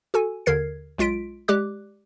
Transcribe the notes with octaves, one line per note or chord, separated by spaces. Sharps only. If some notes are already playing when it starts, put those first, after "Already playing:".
F#4 A4 G#5
D#2 D3 A#4 G#6 C7
B1 G#3 F4 B6 D7
G#3 G4 D5 D6 F#6